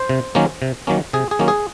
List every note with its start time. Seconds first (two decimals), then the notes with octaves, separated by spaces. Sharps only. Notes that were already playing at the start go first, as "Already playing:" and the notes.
Already playing: C5
0.09 C3
0.35 D#3 F#3 A#3 C#4
0.62 C3
0.87 D#3 F#3 A#3 C#4
1.13 C3 G#4
1.31 G#4
1.39 D#3 F#3 A#3 C#4
1.48 G#4